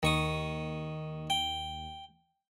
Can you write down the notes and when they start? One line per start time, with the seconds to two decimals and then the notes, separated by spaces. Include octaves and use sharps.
0.03 D#2 D#3 C#6 D#6
1.30 G5